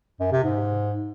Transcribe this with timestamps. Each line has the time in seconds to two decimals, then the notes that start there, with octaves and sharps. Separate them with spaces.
0.20 F#2
0.32 C3
0.44 G#2